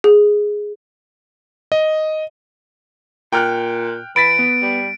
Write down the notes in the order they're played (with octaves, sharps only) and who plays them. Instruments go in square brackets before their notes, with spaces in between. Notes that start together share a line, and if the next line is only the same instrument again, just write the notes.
[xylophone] G#4
[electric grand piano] D#5
[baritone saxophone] A#2 [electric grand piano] G5 F6 F#6
[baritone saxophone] E3 [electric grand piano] B5 A6 B6 [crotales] D7
[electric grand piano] B3
[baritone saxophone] G3